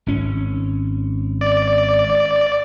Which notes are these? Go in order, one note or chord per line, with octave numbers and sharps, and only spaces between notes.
G#1 C#4
D5